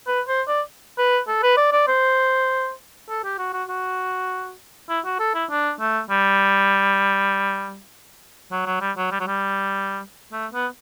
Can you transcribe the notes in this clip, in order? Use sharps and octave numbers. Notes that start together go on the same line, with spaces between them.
B4
C5
D5
B4
A4
B4
D5
D5
C5
A4
G4
F#4
F#4
F#4
E4
F#4
A4
E4
D4
A3
G3
F#3
F#3
G3
F#3
G3
F#3
G3
A3
B3